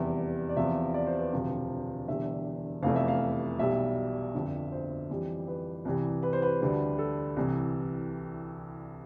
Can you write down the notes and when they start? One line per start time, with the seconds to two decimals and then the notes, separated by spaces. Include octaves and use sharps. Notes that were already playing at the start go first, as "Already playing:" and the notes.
Already playing: F1 E2 C3 G3 E5
0.49 D5
0.56 E2 C3 F3 E5
0.94 D5
1.07 C5
1.19 B4
1.33 E1 D2 C3 F3
2.08 E1 E2 D3 G3 E5
2.83 F1 E2 C3 E3 A3 F5
2.96 E5
3.08 F5
3.59 B1 B2 G3 E5
4.35 G1 F2 D3
4.72 C5
5.10 F2 E3 G3
5.48 B4
5.85 C2 C3 E3 G3
6.23 B4
6.33 C5
6.42 B4
6.61 D2 D3 G3
6.98 A4
7.36 C2 C3 E3